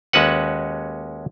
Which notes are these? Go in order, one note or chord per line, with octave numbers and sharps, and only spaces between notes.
D#2 G#3 C#4 F#4 B4 F#5